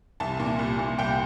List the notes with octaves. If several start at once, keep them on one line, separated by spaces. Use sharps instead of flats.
C2 A5
A#2
C2
A#2
C2 G5